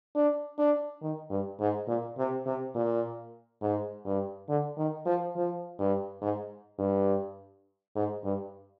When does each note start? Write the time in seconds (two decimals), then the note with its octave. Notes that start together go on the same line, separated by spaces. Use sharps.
0.15 D4
0.58 D4
1.02 D#3
1.30 G2
1.60 G#2
1.88 A#2
2.18 C3
2.46 C3
2.75 A#2
3.62 G#2
4.05 G2
4.48 D3
4.78 D#3
5.06 F3
5.36 F3
5.79 G2
6.22 G#2
6.79 G2
7.95 G#2
8.24 G2